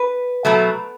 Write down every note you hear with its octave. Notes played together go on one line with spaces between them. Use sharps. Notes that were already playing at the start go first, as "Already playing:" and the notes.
Already playing: B4
B2 F#3 A3